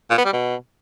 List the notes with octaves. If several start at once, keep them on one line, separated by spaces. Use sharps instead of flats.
A#2
B3
G3
B2